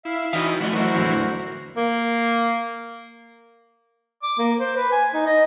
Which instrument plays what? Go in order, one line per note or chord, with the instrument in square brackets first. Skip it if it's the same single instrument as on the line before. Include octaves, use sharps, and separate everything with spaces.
[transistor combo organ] E4 [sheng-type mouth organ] E5 F5
[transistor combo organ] E3 D#4 [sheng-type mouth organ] C#4 G5 [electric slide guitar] F#4 E5 F5
[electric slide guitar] F3 A3 D#5 [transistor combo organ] F#4 [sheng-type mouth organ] D5
[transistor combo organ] E3 F#3 [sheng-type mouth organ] F#4 A#4 C5
[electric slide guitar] E2 A2 D3
[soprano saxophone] A#3
D6
A#3
C5
B4
G#5
D#4
D#5